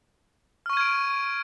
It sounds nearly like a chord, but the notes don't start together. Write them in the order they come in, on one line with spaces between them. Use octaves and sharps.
F6 C#6 D#7 G#6 D7